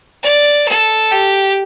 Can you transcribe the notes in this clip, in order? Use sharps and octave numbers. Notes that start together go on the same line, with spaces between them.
D5
A4
G4